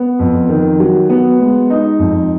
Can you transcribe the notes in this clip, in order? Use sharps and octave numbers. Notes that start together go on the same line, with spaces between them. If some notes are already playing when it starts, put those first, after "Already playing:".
Already playing: B3
F2
D#3
F#3
B3
G#3
D#4
F2